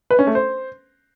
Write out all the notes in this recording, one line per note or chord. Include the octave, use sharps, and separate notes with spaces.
B4
C#4
A3
C5